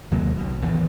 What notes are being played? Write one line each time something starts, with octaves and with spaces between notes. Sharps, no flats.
D#2 C3 F#3 A#3
B1 B2
A1 E2 D#3